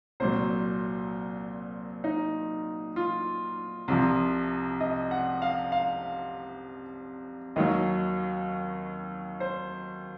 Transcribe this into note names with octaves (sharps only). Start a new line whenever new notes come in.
C2 A#2 F#3 C5
D#4
F4
C2 C3 F3
D#5
F#5
F5
F5
D#2 D#3 F#3 D#5
C5